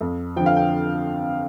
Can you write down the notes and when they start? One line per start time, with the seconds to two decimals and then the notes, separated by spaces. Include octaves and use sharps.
0.01 F2
0.36 D3 F3 G5
0.46 F5
0.57 G5